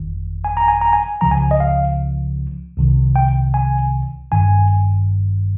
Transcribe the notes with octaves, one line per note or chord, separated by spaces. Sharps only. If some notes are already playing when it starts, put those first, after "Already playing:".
Already playing: G1 F2 D#3
G#5
A#5
G#5
A#5
G#5
C#2 C#3 F3 A#5
G#5
D#5
F5
C2 C3 D#3
G5
G#5
G#1 G2 D#3 G#5